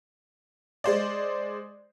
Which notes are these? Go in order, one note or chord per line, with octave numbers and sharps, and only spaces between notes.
G#3 C5 D5